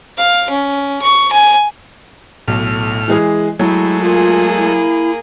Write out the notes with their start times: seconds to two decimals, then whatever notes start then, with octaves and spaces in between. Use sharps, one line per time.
0.17 F5
0.50 C#4
1.01 C#6
1.32 G#5
2.48 B1 A2 F6
3.08 E3 G#3 G#4
3.59 F#3 G#3 A3 E4
4.02 A#3 F4 G#4
4.57 E4